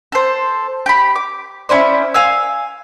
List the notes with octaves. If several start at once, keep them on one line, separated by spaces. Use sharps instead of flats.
A4 C5
G4 B5
D6
C#4 E4 C5 D5
F5 G#5 E6